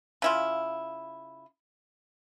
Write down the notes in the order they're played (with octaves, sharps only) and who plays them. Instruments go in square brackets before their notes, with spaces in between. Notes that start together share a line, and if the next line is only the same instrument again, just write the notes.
[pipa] C#3 E4 F4